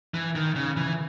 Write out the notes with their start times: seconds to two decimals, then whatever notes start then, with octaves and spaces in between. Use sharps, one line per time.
0.14 E3
0.35 D#3
0.55 C#3
0.77 E3